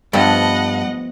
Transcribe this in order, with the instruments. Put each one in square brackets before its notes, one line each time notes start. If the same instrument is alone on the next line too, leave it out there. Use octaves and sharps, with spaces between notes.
[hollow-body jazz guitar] G2 [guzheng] F3 A3 B3 [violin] D#5 F#5